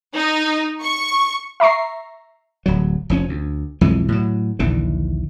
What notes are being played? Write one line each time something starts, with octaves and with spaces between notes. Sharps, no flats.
D#4
C#6
E5 A#5 C#6 C7
D1 F#3
F1 F3 C#4
D2
B1 F2 E3 G#3
A2 F#3
A#1 D#2 D3 E3